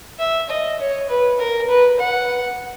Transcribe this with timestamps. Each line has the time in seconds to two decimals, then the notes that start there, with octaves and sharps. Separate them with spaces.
0.19 E5
0.49 D#5
0.79 C#5
1.09 B4
1.39 A#4
1.69 B4
1.99 F#5